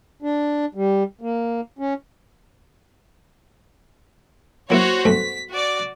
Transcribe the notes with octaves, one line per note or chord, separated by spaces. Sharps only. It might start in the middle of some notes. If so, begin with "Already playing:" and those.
D4
G3
A#3
C#4
F#3 A#3 E4 F#4 C5 C#5
B1 G2 A3 B6
F#4 D5